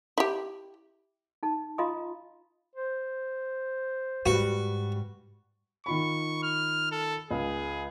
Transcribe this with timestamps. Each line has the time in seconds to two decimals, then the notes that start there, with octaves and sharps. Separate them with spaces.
0.18 E4 G4
1.43 D#4 A5
1.78 F4 D#5 F5 A#5 C6 D#6
2.75 C5
4.26 G#2 G3 F#4 B4
5.86 D#3 F4 B5 C#6
6.43 F6
6.91 A4
7.31 C#2 G#4